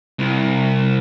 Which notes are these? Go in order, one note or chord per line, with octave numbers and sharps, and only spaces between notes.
C2